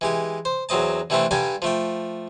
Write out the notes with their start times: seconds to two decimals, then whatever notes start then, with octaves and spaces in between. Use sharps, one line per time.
0.01 E3 G#3 G4
0.45 C5
0.69 E2 F#3 C4 D#5 A5
1.10 D3 E3 G3 A3 C4 D4
1.31 G2 D3 G3 G5 G#5 D6
1.62 F3 A3 G5